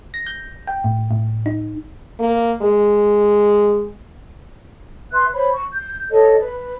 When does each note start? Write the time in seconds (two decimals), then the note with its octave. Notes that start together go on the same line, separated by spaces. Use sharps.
0.14 A#6
0.27 G6
0.67 G5
0.84 A2
1.11 A2
1.46 D#4
2.20 A#3
2.62 G#3
5.12 B4 E5 C6 F#6
5.33 C5 C#5 B5
5.50 C#6
5.71 G6
6.10 A4 C#5 D#5
6.40 B4